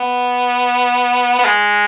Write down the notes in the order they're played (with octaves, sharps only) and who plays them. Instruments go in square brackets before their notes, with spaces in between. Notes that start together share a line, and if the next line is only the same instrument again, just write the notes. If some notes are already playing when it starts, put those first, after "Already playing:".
Already playing: [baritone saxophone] B3
B3
G#3